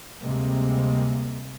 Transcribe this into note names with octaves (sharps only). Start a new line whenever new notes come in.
D2 C3 G3 G#3 A#3 C4